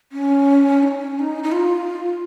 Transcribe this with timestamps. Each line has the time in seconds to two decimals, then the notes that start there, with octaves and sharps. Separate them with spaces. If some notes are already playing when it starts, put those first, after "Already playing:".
0.12 C#4
0.83 D#4
0.87 C#4
1.19 D#4
1.43 D#4
1.52 F4